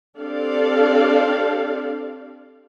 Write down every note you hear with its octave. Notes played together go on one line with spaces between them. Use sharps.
C4 D4 G4 A4 D5 F5